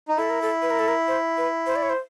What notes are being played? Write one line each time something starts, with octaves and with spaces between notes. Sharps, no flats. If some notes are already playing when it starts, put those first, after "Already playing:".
D#4
E4 A4
A#4
A4
B4
A#4
A4
A#4
C5
B4
C5
D5
C#5
C5